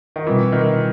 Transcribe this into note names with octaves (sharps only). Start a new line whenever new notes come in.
D#3
B2 E3 G3 C4 F4
D#3